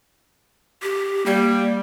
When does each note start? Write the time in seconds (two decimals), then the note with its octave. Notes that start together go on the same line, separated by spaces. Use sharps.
0.82 G4
1.26 G3 A#3